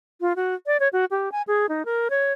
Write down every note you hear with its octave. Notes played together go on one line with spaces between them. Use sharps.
F4
F#4
D5
C#5
F#4
G4
G#5
G#4
D#4
A#4
C#5